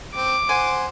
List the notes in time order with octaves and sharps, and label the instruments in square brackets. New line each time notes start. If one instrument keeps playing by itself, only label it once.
[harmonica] C4 [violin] D6
[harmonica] C5 F#5 [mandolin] G#5